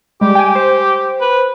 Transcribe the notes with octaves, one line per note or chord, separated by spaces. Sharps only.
G3 G#3 G4
G5 G#5
C5
B4